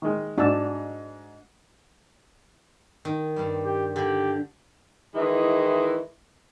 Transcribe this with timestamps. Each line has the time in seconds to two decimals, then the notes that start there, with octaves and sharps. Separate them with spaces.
0.02 D#3 G#3
0.38 G#2 D4 F#4 A5 E6
3.05 D#3
3.36 G2 G3
3.65 G4
3.96 D3 G4 B5
5.14 D#3 E3 G#3 E4 D#5